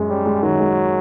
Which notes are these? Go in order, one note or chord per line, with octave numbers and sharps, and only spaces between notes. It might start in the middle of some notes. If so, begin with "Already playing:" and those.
Already playing: F#2 G#3
G3 C#4
G#3
D#3 F#3
G#3